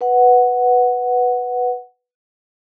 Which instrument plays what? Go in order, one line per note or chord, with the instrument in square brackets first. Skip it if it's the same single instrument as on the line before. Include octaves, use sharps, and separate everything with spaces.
[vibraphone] B4 F#5